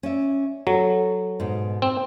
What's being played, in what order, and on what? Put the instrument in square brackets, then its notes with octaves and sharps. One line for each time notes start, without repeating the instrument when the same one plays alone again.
[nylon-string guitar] C#4 D5 E5
[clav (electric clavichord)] F#3 [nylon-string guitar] A4
[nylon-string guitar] G#2 B2
[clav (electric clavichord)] C4